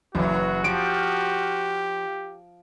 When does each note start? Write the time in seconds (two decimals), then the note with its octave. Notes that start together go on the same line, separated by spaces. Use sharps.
0.15 F#1 E3 F#3 F#4
0.64 F3 G4 D7